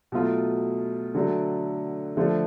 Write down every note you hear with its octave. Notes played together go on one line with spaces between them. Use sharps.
B2 F#3 A3 F4
D3 F#3 A3
D3 F3 A3